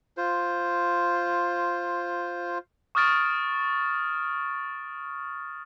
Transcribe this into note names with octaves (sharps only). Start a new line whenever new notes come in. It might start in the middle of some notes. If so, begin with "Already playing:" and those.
F4 C5
C#6 D#6 F6 A6 D7